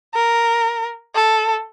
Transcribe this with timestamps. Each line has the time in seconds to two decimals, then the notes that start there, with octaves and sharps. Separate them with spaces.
0.14 A#4
1.15 A4